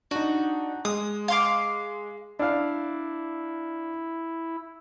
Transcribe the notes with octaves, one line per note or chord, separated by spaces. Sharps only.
D4 D#4 F#4
G#3 D#6
F5 C6 D6
D4 E4 F5